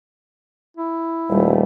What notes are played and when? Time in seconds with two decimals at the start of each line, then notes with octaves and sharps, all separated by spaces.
0.77 E4
1.29 D#1 G3 A3